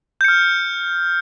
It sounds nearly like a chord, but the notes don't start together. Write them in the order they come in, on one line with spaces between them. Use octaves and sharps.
G6 C#7 F6